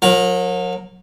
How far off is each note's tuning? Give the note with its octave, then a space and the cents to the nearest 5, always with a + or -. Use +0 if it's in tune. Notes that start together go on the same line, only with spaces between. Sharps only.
F#3 -40 A#4 +0